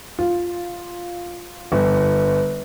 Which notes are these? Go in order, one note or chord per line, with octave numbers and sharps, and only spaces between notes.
F4
G1